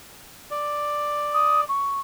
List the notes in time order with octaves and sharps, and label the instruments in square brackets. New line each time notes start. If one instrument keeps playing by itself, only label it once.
[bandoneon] D5
[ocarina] D#6
C#6